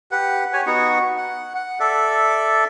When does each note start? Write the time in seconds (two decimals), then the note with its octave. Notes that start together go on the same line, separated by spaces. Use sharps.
0.11 G4 B4 F#5
0.53 G4 C#5 G#5
0.66 B3 D#4 F#4 C#6
1.17 F#5
1.55 F#5
1.80 A4 D5 E5